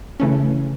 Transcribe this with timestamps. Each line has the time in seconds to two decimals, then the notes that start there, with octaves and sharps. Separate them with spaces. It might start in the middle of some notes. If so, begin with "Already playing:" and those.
0.20 C#2 C#3 E3 A3 C#4